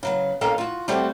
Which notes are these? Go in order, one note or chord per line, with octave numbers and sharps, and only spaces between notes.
C#3 F#3 B3
A#3 C#4 A4 D#5 F5 G5
F4 F#4
G3 A3 C4 F#4 G4 A4